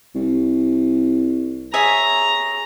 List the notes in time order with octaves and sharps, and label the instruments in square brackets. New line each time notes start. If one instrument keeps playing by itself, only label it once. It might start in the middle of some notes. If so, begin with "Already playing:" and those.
[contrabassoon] C2
[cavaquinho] G#4 C#5 E5 [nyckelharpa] A#5